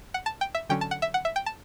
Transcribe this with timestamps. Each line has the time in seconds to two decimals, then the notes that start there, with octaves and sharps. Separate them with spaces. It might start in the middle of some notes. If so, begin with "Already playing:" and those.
0.14 F#5
0.26 A5
0.41 G5
0.55 E5
0.69 D3 F#3 C#4 G5
0.81 A5
0.91 F#5
1.02 E5
1.14 F#5
1.25 E5
1.36 G5
1.46 A5